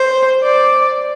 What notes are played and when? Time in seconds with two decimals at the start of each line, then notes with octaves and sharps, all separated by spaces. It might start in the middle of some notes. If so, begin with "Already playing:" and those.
Already playing: C5
0.43 D5